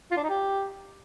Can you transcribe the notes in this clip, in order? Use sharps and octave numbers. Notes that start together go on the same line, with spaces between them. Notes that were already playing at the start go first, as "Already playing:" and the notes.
F4
D4
D#4
G4